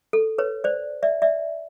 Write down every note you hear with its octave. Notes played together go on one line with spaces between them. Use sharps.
A4
B4 C#5
C5 D5
D5 E5
D5 E5